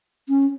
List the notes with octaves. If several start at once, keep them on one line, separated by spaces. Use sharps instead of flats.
C#4